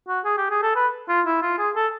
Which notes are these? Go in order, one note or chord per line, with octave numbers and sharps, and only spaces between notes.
F#4
G#4
G4
G#4
A4
B4
F4
E4
F4
G#4
A4